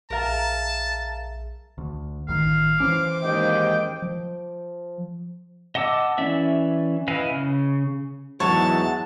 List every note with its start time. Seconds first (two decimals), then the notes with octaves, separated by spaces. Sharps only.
0.10 A#1 G#4 A#4 E5 F5 A5 A#5
1.78 D2
2.28 A1 D#3 F5
2.80 E3 C#4 C5 D6
3.23 D#2 G#2 D#5 G5
4.02 F3
5.75 D#5 F#5 A5 D6 E6
6.18 E3 C#4 D5 E5
7.08 E4 B4 D#5 F5 G#5
7.31 C#3
8.40 E2 G#2 F#3 C#5 E5 F#5 A5